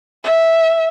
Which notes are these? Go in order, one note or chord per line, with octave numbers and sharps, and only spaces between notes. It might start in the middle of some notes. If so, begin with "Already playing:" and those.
E5